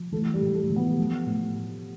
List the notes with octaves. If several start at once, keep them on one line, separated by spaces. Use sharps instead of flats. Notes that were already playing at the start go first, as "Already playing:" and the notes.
Already playing: F3
E3 A3
G3
A2
A3
E3
B3
F3
A2